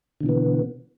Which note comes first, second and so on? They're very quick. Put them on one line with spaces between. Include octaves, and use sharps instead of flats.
D3 B2 E3 B3